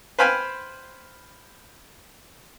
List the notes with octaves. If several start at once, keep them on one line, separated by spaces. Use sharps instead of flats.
B4 C5 F5 G5 G#5 B5